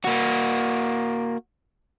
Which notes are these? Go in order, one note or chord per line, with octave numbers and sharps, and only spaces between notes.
A#3 F#4